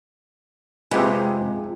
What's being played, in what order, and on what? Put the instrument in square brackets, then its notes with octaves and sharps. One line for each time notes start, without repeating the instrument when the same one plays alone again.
[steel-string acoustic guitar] F2 [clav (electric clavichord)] C3 G4 B4 [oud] G#3 D#4